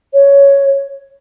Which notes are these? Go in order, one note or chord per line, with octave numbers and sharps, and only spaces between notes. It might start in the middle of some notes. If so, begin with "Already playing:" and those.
C#5